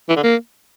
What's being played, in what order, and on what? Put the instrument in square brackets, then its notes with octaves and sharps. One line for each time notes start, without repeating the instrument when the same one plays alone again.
[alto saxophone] E3
D3
A#3